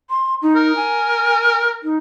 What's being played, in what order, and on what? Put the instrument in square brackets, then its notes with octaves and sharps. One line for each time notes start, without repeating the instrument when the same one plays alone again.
[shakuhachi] C6
D#4
[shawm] A#4
[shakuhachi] G#5
D#4